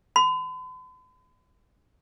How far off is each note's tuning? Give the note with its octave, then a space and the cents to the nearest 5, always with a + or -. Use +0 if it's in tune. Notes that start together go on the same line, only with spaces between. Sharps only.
B5 +45